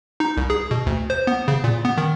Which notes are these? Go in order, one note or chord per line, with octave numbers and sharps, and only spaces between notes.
D#4
C2
G#4
B2
D2
C5
B3
C#3
A#2
B3
D#3